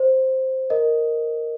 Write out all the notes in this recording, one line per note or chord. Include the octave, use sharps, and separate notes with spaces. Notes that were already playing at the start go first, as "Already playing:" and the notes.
Already playing: C5
A#4 D#5